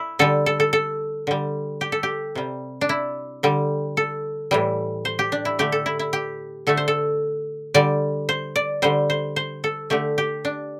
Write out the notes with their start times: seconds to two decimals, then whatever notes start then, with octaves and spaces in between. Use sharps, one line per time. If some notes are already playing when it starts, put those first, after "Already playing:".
Already playing: E4
0.19 D3 G3 A4
0.46 A4
0.60 A4
0.73 A4
1.27 D3 G3
1.81 G4
1.92 A4
2.03 G4
2.35 C3 G3
2.81 D4
2.89 E4
3.43 D3 G3
3.97 A4
4.51 A2 E3 G3
5.05 C5
5.19 G4
5.32 D4
5.45 E4
5.59 D3 A3 G4
5.72 A4
5.86 E4
5.99 E4
6.13 G4
6.67 D3 A3 A4
6.77 C5
6.88 A4
7.74 D3 G3 D5
8.29 C5
8.56 D5
8.82 D3 G3 C5
9.10 C5
9.36 C5
9.64 A4
9.90 D3 A3 G4
10.18 G4
10.45 D4